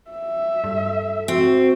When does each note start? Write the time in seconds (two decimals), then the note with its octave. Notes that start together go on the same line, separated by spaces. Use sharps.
0.10 E5
0.64 G2 A4
1.28 C4 F#4